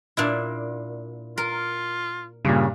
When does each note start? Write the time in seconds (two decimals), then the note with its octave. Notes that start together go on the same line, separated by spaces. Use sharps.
0.17 A#2 D4 E4
1.38 F4 A#4
2.45 G2 A#2 C#3